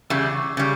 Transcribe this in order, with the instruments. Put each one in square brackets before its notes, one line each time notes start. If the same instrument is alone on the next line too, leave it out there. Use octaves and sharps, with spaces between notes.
[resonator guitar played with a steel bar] E2 C#3 G3 [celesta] E6
[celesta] D6
C#6
D6
[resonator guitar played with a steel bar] C#3 G3 [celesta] C#6